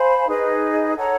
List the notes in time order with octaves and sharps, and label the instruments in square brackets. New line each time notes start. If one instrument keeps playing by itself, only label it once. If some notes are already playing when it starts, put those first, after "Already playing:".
Already playing: [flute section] C5 F5 G#5 B5
D#4 G#4 B4 D#5
A4 C#5 F#5 A#5